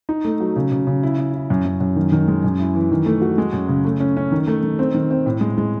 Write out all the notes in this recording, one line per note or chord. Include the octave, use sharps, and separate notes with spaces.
D#4
A3
F#3
C#3
C#3
C#3
E4
E4
E4
F#2
F#2
F#2
D#3
D#3
G#3
F#2
E4
E3
D#3
A3
F#4
G#3
F#2
C#3
A3
C#4
C#4
D#3
A3
D#3
C4
D#3
C4
A2
G#3
G#3